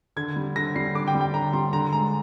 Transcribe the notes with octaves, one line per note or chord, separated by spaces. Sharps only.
D3 G#6
G3
D3 A#6
G3 C7
D3 D6
G5
G3
G5
D3 A#5
G3 C6
D3 A#5
G#3 A#5